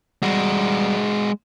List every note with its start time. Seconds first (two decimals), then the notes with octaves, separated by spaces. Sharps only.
0.23 G3 G#3 F#4